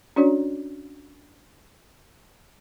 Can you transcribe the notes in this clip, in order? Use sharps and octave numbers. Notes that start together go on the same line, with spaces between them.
C#4 D4 F#4 C#5 D5 A#5